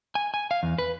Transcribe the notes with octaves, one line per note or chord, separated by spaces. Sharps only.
G#5
G#5
F5
E2
B4